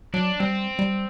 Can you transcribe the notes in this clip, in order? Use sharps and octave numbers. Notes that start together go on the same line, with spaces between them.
F#3 D4
G3 C4
G3